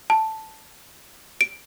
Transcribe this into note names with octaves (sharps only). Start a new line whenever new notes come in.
A5
D7